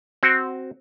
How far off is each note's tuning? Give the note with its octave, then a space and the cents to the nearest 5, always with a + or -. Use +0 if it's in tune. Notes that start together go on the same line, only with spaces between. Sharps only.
C4 +0 F#4 +10